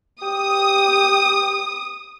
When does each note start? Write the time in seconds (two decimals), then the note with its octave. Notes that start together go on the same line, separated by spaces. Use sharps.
0.22 G4 D#6